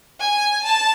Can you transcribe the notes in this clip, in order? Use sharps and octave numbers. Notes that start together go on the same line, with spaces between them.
G#5
A5